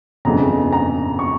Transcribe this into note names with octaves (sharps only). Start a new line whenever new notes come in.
G1 F2 C#3 A#5
A#5
C#6